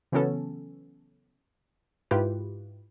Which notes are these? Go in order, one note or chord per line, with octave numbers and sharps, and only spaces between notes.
C#3 E3 F#3 B3 C#4 A4
G#2 E4 F4 G4 B4